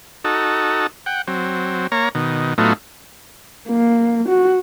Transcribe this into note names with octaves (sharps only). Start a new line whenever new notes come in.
D#4 F#4 A4
F#5 G5
F#3 C4
A#3 C#5 A#5
B2 D#3
A2 F#3 A3 B3 D#4 F4
A#3
F#4